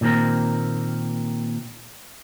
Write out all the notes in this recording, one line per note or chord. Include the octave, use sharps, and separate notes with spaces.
A#2 D#3 A#3 C4 A#4